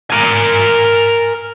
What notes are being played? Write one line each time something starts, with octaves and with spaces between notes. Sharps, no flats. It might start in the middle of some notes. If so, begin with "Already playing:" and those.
A#4 G#5